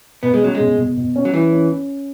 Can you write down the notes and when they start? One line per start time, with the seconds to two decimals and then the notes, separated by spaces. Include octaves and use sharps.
0.23 B2 B3
0.34 G#3
0.42 F#3 C#4
0.55 G#3
0.60 B2
0.78 B2
0.97 B2
1.16 C#4
1.25 F#3
1.34 E3 C#4
1.52 C#4
1.71 C#4